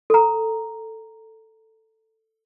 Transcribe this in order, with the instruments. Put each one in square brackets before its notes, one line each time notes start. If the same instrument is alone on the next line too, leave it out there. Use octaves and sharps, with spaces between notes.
[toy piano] A4 A#5